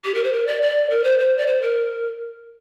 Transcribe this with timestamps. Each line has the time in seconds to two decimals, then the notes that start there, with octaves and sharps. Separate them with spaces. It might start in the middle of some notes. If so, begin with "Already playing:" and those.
0.04 G4
0.14 A#4
0.23 C5
0.32 A#4
0.47 D5
0.62 D5
0.89 A#4
1.03 C5
1.19 C5
1.37 D5
1.46 C5
1.61 A#4